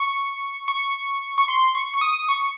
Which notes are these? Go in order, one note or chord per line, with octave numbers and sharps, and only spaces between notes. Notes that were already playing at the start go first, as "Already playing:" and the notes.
Already playing: C#6
C#6
C#6
C6
C#6
C#6
D#6
C#6